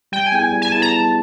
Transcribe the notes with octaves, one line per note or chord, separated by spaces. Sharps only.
G3 G5
G#5
B3 E4 G#4 G5
G#5
G3
G#5
B3 E4 G#4 A5
A#5
G3 A5